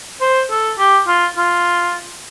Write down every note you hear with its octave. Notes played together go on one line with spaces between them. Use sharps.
C5
A4
G4
F4
F4